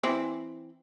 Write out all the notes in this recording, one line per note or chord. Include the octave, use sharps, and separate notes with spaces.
E3 C4 E4